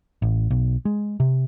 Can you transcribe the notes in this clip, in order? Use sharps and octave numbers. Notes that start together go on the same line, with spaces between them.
A1
B1
G#3
C3